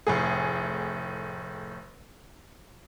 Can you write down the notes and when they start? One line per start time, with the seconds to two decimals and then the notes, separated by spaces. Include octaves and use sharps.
0.07 F1 A2 G#4